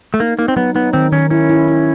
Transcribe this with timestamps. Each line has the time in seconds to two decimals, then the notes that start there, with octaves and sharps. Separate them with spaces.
0.14 A3
0.20 A#3 D#4
0.39 A#3 D#4
0.48 C4
0.56 F#3 B3
0.75 B3 D#4
0.93 D#3 C4
1.12 D#3 C#4
1.30 C#4 E4
1.50 E4
1.68 E4